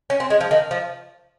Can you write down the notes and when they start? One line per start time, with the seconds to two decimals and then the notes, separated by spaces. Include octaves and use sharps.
0.10 C#4
0.20 C4
0.30 G#3
0.41 F3
0.51 D#3
0.71 F3